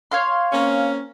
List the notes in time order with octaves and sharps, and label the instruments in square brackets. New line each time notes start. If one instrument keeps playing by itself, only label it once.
[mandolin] C#5 F5 C6
[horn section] A#3 C4 C#4